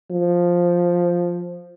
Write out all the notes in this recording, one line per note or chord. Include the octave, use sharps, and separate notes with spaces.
F3